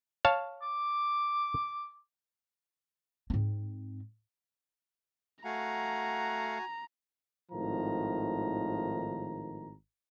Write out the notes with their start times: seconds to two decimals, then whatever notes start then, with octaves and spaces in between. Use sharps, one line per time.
0.25 C#5 F5 A5
0.62 D6
3.30 G#2 C4
5.45 A3 F#4 F5 F#5 G#5 A#5
7.51 G#1 A2 D#3 F3 A#5